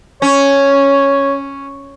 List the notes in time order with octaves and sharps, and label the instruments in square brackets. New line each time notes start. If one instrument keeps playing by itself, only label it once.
[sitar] C#4 [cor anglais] C#5